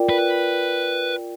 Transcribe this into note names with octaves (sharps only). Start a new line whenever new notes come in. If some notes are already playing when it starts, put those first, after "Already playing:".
Already playing: F4 A#4 D5 G5
B4